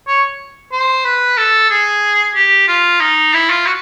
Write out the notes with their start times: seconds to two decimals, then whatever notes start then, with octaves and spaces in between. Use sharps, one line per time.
0.07 C#5
0.72 C5
1.05 B4
1.37 A4
1.70 G#4
2.35 G4
2.68 F4
3.01 D#4
3.33 E4
3.50 F4
3.66 F#4